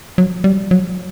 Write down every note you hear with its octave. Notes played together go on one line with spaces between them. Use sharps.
F#3
G3
F#3